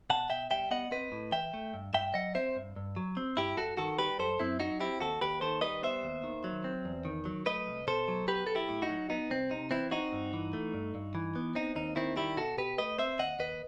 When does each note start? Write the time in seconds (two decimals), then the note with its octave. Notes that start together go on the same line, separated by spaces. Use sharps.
0.10 B2 F#5 A5
0.30 B2 E5 G5
0.51 G3 E5 G5
0.71 B3 D#5 F#5
0.91 C4 B4 D#5
1.12 A2
1.32 E3 E5 G5
1.54 A3
1.74 G2
1.94 G2 E5 G5
2.14 F#3 D#5 F#5
2.35 C4 C5 E5
2.56 G2
2.76 G2
2.96 F#3
3.17 C4
3.37 G2 E4 G4
3.57 G2 F#4 A4
3.77 D#3 F#4 A4
3.99 G3 G4 B4
4.19 F#2 A4 C5
4.40 F#2 C4 E4
4.59 F#3 D#4 F#4
4.80 C4 E4 G4
5.00 D#2 F#4 A4
5.21 D#2 G4 B4
5.41 D#3 A4 C5
5.61 G3 B4 D#5
5.83 B3 C5 E5
6.03 D#2
6.24 D#3
6.44 F#3
6.64 C4
6.85 E2
7.05 D#3
7.25 F#3
7.46 A3 B4 D#5
7.67 C2
7.88 B2 A4 C5
8.08 F#3
8.28 B3 G4 B4
8.47 B1 A4
8.55 E4 G4
8.69 A2
8.82 D#4 F#4
8.89 F#3
9.10 B3 D#4
9.30 C2 C4
9.50 C3 D#4
9.71 E3 C4 E4
9.91 C4 D#4 F#4
10.12 G2
10.33 E3
10.53 A3
10.74 G2
10.95 G2
11.15 E3
11.36 B3
11.55 C4 D#4
11.76 D#2 D#4
11.96 D#3 C4 E4
12.16 G3 E4 G4
12.37 B2 F#4 A4
12.58 B2 G4 B4
12.78 A3 B4 D#5
12.98 C4 C5 E5
13.19 D#2 D#5 F#5
13.39 D#2 B4 D#5